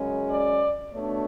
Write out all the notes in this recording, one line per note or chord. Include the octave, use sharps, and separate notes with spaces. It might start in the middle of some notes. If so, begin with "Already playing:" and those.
Already playing: F#2 C#3 G#3 C#4
D5
B2 A3 D4 C#5